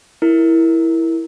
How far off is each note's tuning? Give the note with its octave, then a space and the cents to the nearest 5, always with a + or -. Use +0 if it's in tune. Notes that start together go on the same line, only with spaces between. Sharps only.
E4 +0 A#4 +0